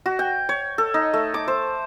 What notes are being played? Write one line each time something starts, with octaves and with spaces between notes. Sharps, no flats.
F#4
G5
C#5
A4
D#4
A3
D6
C5